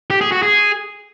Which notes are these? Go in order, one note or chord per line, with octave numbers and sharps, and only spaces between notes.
G4
G#4
F#4
G#4